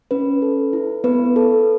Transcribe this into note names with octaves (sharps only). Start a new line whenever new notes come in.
C#4 B4
A4
E4
B3 B4
A4